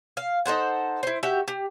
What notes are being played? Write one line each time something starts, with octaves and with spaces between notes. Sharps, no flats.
F5
D#4 A4 C5 F#5
E4 C5
F#4 G4 E5
G4